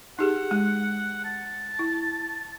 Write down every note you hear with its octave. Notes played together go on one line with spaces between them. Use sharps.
D#4 G4 G#4 F#5
G#3
A5
E4